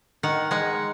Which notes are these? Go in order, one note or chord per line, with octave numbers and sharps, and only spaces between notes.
D#3 F#5
G#3 F#5